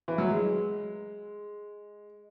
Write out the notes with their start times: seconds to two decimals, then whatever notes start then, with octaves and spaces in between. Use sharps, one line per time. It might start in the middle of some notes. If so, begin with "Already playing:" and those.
0.08 E3
0.18 F#3
0.29 G#3